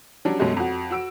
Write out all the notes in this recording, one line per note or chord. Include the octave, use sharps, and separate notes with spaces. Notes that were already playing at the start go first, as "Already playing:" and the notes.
F#3 G3 C#4 D4
F#2 B2 F#3 G#3 A3
F2 F#4
F#4 E6 D7